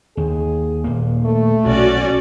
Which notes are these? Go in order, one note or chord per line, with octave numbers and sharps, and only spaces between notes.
D#2 G#4
D#1 A#3
A3
B1 C#4 F#4 D5